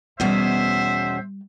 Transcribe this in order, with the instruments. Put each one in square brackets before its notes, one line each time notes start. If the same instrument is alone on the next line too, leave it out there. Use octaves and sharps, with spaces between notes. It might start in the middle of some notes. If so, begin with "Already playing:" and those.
[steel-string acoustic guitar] E2 B2 C#4 [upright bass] G3 [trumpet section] C5 E5